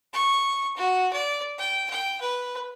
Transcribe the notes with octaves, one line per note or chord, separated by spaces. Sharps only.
C#6
F#4
D5
G5
G5
B4